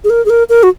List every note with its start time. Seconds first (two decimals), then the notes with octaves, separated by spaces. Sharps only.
0.04 G#4
0.10 A#4
0.25 G#4
0.30 A#4
0.49 A#4
0.63 F#4